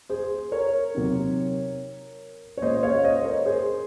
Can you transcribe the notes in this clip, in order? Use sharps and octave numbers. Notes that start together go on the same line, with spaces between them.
G#4 C5
A#4 C#5
C3 F#3 C4 D#4
C#5
A#2 G#3 C#4 C5 D#5
C#5 F5
C5 D#5
A#4 C#5
G#4 C5